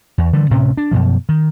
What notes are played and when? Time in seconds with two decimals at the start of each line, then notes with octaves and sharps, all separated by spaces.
0.18 E2
0.33 D3 E3 G3
0.50 D2 A2 C3 C#4
0.77 D4
0.91 F#2 B2 F3
1.29 D#3